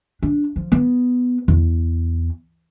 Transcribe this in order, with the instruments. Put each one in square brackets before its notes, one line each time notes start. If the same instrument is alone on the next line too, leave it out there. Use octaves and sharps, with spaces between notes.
[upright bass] D4
F3
B3
E2